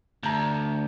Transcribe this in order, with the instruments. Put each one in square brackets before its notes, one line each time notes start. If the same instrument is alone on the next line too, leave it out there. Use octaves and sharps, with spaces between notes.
[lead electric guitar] D2 [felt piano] A5 A#5 G6